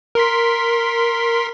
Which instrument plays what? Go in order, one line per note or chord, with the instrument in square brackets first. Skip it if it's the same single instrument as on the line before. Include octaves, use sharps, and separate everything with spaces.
[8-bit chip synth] A#4 C6 B6